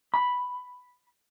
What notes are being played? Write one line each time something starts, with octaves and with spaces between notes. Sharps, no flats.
B5